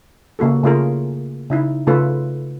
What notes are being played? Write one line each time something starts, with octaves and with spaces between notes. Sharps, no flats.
C#3 A#3 F#4 A4
C#3 A3 F4 G#4 A#4
C#3 D#4 E4
C#3 A3 F4 A4 B4